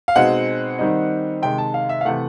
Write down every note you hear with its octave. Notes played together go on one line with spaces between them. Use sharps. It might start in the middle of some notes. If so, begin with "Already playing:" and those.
F5
B2 G#3 C4 D#4 F#5
D#3 G3 C4 D#4
C3 D#3 G#3 G5
A5
F5
E5
F5
C3 E3 A3 F#5